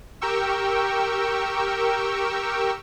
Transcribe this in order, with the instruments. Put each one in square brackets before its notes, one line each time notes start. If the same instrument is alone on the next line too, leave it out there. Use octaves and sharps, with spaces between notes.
[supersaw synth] G4 A#4 G5 C#6 E6